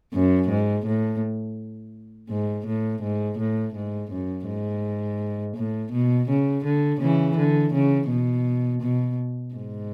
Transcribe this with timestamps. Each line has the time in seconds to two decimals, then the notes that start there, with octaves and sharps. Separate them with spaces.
0.14 F#2
0.50 G#2
0.86 A2
2.30 G#2
2.67 A2
3.03 G#2
3.39 A2
3.75 G#2
4.12 F#2
4.47 G#2
5.57 A2
5.92 B2
6.29 C#3
6.65 D3
7.01 C#3 E3
7.38 D3
7.74 C#3
8.09 B2
8.82 B2
9.55 G#2